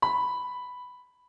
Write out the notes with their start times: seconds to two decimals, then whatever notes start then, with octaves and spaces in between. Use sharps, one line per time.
0.02 B5